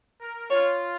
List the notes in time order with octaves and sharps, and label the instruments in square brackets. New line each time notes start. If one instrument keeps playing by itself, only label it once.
[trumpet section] A#4
[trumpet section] F4 [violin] C#5